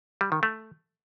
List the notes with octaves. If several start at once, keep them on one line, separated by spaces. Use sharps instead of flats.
G3
D#3
A3